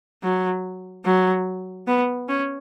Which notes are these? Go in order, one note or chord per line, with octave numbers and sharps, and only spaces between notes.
F#3
F#3
B3
C#4